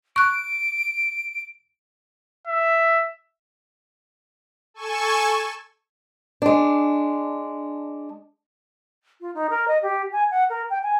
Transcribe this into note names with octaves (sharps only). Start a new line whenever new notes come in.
C#6 F#6 D7
E5
A4 G#5 C#6 E7
G#3 D4
F4
D#4
A#4
D#5
G4
G#5
F#5
A#4
G5
G#5